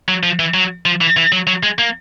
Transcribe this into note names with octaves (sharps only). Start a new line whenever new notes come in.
F#3
F3
E3
F#3
F3
E3
E3
F#3
F#3
G#3
A#3